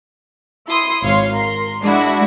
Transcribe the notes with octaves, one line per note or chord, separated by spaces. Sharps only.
E4 C6 D#6
G#1 C#5 F5 C6
A#4 C6
G#3 D4 E4 F#4